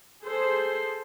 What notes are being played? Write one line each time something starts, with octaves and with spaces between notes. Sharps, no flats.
G#4 A4 C5